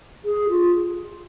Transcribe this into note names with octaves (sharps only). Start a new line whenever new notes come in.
G#4
F4